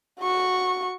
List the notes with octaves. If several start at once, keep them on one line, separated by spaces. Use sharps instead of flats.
F#4 C#6